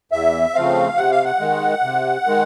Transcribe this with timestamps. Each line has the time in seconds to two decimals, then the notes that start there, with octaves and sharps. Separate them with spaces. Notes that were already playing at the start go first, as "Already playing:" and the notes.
0.12 E2 E5
0.54 C#3 F3 A3 C4 F5
0.97 C3 F#5
1.11 F5
1.25 F#5
1.40 D#3 G#3
1.83 C3
2.26 D#3 G#3